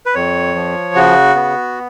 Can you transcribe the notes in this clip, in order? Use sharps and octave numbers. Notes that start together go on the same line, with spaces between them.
B4
F2 C#5
F3
C#3 F#4
B3